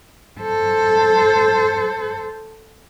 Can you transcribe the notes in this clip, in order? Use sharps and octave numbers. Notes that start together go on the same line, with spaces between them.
A4 C5